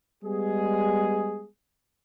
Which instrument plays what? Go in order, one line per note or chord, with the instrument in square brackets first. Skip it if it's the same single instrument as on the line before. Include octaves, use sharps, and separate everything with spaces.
[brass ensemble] G3 G#3 B3 G#4